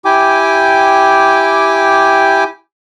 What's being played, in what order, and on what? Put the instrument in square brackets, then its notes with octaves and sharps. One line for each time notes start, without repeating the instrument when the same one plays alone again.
[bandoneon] E4 G4 G5 G#5 D6